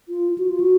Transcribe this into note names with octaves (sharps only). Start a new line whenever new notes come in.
F4
F#4
F4
F#4